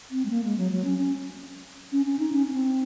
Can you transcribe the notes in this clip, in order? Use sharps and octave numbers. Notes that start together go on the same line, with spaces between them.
C4
G#3
A#3
G#3
F#3
F#3
C#4
C#4
C#4
C#4
D#4
C#4
C#4
C4